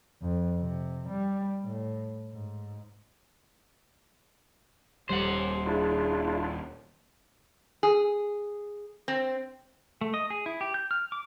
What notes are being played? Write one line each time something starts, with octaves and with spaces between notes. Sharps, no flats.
F2
C3
G3
A2
G#2
D#1 G3 G4 C5 F#5
D4 E4 F4 G#4
G#4
C4
A3
D#5
G#4
E4
G4
G6
F6
D6